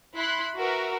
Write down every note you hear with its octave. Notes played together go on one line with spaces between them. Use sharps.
E4 B5 C6 F#6
F#4 A#4 B4 E5